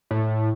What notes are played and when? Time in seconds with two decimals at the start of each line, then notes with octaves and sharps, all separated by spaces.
0.11 A2